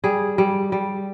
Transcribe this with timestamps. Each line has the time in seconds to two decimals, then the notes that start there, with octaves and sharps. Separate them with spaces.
0.04 G3 G#4
0.38 G3
0.72 G3